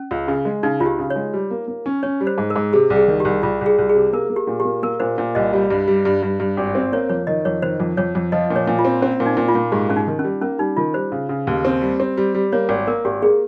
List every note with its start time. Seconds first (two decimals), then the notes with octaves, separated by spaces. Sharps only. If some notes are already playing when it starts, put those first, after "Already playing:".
Already playing: C#4
0.11 C#2
0.28 C#3
0.45 G#3
0.63 C#3 D#4
0.80 C#2 F4
0.86 G4
0.99 C#3
1.10 C#5
1.16 G#3
1.33 G3
1.51 A#3
1.68 A#3
1.86 C#4
2.03 C#4 C#5
2.21 G3
2.27 C5
2.38 G#2
2.50 A#4
2.56 G#2
2.73 C3 G#4
2.90 C2
2.96 G#4
3.08 D#3
3.20 C2 G4
3.43 C2 F4
3.61 C2
3.66 G#4
3.78 C2
3.89 G#4
3.95 C3
4.13 A#3 A#4
4.30 A#3
4.36 G4
4.47 A#2
4.60 A#3 G4
4.83 A#3 A#4
5.00 A#2 C5
5.18 A#2
5.35 C2 D#5
5.53 G3
5.70 G2
5.88 G3
6.05 G2
6.23 G2
6.40 G2
6.57 G#1
6.75 C4
6.92 A#3 C#5
7.09 F2 C#5
7.27 D#3 D#5
7.45 F2 C#5
7.62 D#3 C5
7.80 F2
7.97 F2 C#5
8.15 F2
8.32 F3 D#5
8.51 A#2
8.56 C#5
8.67 A#2
8.79 F4
8.85 C4
9.02 C4 C#4
9.20 A#2
9.26 D#4
9.37 A#2
9.48 F4
9.55 A#2
9.72 G#2 G4
9.89 G#2 C#4
9.96 D#4
10.08 D#3
10.19 G3 C#4
10.42 A#3 C#4
10.59 G3 D#4
10.77 D#3 F4
10.94 G3 C5
11.12 C#3
11.29 C#3
11.47 D#2
11.65 C4
11.82 G3
12.00 C4
12.17 G3
12.34 G3
12.52 A#3 C#5
12.69 G#1
12.87 A#3 A#4
13.05 G#1 G4
13.22 A#3 G#4